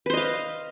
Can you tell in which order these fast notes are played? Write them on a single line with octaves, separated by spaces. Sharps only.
B4 C5 D#5 F5